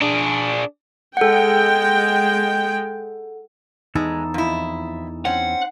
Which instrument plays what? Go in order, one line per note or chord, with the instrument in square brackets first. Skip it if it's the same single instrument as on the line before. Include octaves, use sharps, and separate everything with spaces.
[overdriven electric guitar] D4 G#4
[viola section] G#3 G5 [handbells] A4 F#5
[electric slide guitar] E2 E3 A4 [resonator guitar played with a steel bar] G#3 [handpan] D#4
[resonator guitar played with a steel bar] F2 E4
[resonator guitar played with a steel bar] C4 C#4 [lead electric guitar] F#5